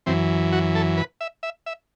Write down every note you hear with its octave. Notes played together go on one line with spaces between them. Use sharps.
F#2 E3 C4
F#4
A4
B4
E5
E5
E5